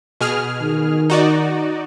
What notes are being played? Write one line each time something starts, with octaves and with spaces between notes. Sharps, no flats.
B2 G#4 F6
D#3
D#4 F#4 D5